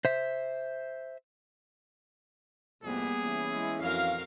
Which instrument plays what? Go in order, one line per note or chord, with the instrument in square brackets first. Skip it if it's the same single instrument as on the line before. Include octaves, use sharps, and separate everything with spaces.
[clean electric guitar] C5 E5
[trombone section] C2 F2 C3 [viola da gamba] G3 A#3 B3 [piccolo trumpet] G#4
[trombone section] E3 C#4 E4
[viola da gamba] G#3
[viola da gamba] F2 F#4 A#4 [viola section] F5